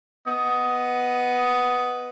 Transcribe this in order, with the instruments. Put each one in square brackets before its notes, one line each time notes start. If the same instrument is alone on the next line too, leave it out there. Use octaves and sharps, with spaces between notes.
[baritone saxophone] B3 [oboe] D#5